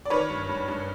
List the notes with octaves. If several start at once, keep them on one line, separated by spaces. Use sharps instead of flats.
D5
D#3 B4 C#5
G2
G2
G2